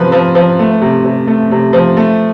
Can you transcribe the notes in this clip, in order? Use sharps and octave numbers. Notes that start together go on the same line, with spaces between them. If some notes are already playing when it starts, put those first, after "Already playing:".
Already playing: C3 F3 B4
F3
F3
A3
C3
C3
A3
C3
F3
A3